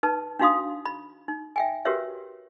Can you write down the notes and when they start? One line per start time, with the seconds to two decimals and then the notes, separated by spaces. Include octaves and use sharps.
0.03 D#4 B4 A5
0.39 D4 D#4 F#4 F5 C6 D#6
0.85 B5
1.28 D#4
1.56 E5 G5 G#5
1.85 F#4 G4 A#4 B4 C#5 E5